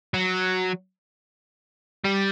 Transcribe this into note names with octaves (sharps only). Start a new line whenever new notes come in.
F#3
G3